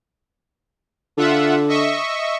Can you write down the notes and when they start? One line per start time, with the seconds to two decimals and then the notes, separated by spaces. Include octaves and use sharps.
1.18 D3 F4 E5 F#5
1.68 D#5 E5 C#6